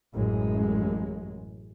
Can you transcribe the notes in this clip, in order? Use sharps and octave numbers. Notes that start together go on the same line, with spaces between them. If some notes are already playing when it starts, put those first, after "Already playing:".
A1 F#2 G#3